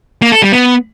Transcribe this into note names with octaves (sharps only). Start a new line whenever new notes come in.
A#3
A4
G3
B3